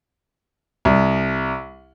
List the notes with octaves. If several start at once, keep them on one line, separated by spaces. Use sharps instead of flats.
C2